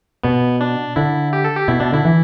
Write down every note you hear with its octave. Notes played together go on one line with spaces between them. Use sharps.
B2 B3
D4
D3 E4
G4
A4
G4
B2 E4
B2 D4
D3 E4
E3